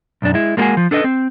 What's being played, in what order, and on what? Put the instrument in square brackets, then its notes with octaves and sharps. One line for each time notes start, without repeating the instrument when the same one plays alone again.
[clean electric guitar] B1 F#2 D4
G#3 E4
G#3 A#3 B3 E4 F#4 G#4
F3
D4 A4 B4 D#5
C4